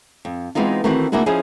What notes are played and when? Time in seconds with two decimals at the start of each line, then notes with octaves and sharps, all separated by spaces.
0.25 F2
0.55 E3 G#3 B3 C4 D#4 F4
0.84 D#3 E3 A3 C4 F#4
1.12 D2 A#3 D4 E4 F#4 G#4
1.26 F3 C#4 D#4 E4 G#4